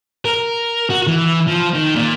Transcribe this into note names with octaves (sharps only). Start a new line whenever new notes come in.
A#4
F#4
E3
F3
D#3
A#2